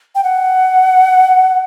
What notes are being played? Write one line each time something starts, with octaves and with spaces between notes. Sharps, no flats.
G5
F#5